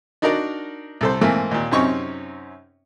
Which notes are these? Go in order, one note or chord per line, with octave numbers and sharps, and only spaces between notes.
D4 D#4 F#4 A#4 D5
C2 A4 C5
G#2 E3 A3 A#3 C4
D#2 A#2
F#2 C3 C4 C#4 D#4 C#6